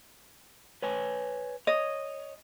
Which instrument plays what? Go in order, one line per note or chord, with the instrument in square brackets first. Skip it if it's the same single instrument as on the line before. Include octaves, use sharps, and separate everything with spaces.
[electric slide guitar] B4 C#5 G#5
[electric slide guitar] C#5 [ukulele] D#5